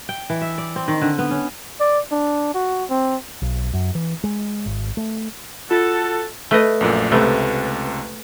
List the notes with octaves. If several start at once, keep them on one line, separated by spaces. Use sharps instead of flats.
G5
E3
E5
D5
C4
D#3
D3
B3
C#4
D5
D4
F#4
C4
B1
F#2
E3
G#3
G#1
A3
F4 F#4 A4
A3 B4 D#5
A#1 F#2 A#2
C#2 C3 A3 B3